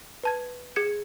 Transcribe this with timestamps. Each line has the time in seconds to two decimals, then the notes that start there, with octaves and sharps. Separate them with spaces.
0.23 B4 A5 G#6
0.76 G#4 G#6 C#7